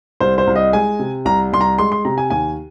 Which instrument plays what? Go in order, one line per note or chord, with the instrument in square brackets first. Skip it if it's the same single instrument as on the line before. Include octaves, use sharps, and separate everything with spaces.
[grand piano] C2 C5
C5
C2
D#5
G#3 G#5
C3
C2 A#5
C2 C6
A#5
G#3 C6
C6
C3 A#5
G#5
D#2 G#5